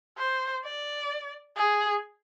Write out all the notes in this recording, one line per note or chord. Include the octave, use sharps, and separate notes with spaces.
C5
D5
G#4